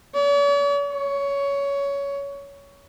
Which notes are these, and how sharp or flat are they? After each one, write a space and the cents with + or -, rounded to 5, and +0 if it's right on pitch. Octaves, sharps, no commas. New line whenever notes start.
C#5 +45
C#5 +15